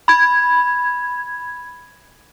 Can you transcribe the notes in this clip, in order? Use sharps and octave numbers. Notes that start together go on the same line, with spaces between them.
B5 G#6